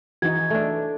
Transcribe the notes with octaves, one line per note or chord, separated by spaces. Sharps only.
E3 D#4 F#4 G#6
A3 D4